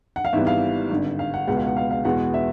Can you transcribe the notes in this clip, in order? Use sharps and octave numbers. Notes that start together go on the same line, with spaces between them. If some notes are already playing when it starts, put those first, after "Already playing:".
F#5
F5
G#1 G#2 E3 G3 B3 E5
F5
G#1 G2 D3
F5
F#5
C#2 B2 G#3 B3 F#5
F5
F#5
F5
F5
E2 B2 G#3 B3 F#5
E5